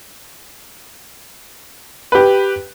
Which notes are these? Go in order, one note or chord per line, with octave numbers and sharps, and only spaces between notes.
G4 B4